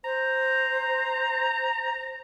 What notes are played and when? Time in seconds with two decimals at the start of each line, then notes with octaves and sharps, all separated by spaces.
0.04 C5 A#5